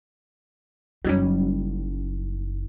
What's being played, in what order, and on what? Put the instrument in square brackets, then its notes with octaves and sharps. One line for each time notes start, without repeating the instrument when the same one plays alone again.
[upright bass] F#1 D#3 [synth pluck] F#3 G3 C#4